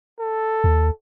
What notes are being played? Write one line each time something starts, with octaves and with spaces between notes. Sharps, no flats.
A4
D#2